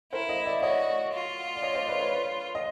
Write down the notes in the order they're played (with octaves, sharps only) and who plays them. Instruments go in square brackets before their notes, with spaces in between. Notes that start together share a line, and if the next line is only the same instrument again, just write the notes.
[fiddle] E4 [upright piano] A#4 C5
[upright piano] D#5 F5
D5 E5
[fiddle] F#4 [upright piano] C#5 D#5
[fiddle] F4
[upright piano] D5
C#5 D#5
C5 D5
B4 C#5
B4 C#5
D#5